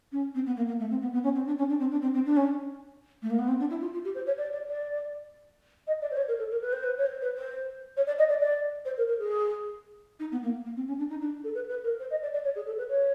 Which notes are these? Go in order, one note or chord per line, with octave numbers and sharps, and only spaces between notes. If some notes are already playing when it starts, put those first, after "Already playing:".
C#4
C4
B3
A#3
A#3
A3
C4
B3
B3
C#4
C4
D4
C#4
D4
C4
D4
C4
C4
D4
C#4
A3
A#3
B3
C4
D4
E4
F4
F4
G4
C5
C#5
D5
D5
D5
D#5
D5
C5
C#5
A#4
A4
A#4
B4
C5
B4
C#5
C5
B4
C5
C#5
D5
D#5
D5
D5
C5
A#4
A#4
G#4
D#4
B3
A#3
A#3
C4
C#4
D4
D#4
D4
A4
B4
B4
A#4
C5
D#5
D5
D5
C#5
G#4
A4
B4
C#5